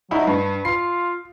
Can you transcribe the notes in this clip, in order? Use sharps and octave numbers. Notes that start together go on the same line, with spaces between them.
F#3 D#4 E4
G2 B4
F4 C7